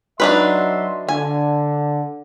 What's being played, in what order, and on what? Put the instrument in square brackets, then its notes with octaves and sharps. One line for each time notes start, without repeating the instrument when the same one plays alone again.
[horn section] F#3 E5 C6 [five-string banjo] D4 D#4 B4
[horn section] D3 [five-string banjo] G#5